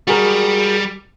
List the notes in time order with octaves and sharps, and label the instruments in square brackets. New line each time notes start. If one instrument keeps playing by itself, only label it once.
[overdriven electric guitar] G3 [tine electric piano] F#4 G#4 A#4